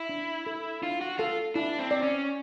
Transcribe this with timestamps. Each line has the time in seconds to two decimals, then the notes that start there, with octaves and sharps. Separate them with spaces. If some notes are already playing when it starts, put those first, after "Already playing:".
Already playing: E4
0.09 D4
0.46 A4
0.82 D4 F4
1.01 F#4
1.18 F4 A4
1.55 D4 E4
1.79 C4
1.91 D5
2.03 C#4